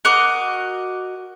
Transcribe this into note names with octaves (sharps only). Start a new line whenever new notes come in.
F#4 A#4 D#5 D6